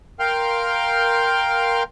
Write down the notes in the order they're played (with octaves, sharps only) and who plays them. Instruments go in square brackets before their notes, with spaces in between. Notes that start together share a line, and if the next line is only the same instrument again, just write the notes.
[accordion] A#4 F5 G5 C6 F6 G6